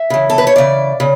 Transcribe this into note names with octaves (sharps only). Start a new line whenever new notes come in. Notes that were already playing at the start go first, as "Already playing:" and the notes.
Already playing: E5
C#3 E3
A4
B4
C#5
C#3 E3 D5
C#3